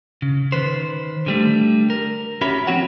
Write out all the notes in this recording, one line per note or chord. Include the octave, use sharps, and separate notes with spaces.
C#3
D#3 B4 C5
D3 G3 A3
A#4
C#4 F#4 G4 C#5 E5 B5
F3 C4 F#4 C#5 F#5